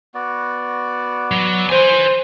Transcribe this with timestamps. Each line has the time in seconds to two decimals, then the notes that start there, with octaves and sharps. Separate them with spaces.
0.14 B3 F#4 D5
1.32 F#3
1.70 B4 C5 G#5